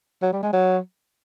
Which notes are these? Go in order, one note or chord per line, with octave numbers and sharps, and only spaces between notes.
F#3
G3
G#3
F#3